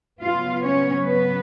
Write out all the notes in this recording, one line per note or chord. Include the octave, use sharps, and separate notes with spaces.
C#3 F#3 B3 F4 F5
C#4 C#5
B3 B4